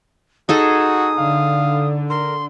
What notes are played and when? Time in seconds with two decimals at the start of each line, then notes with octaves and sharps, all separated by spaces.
0.49 D#4 F#4 G#4 A4 D#6
1.18 D3 F5
2.10 A#4 C6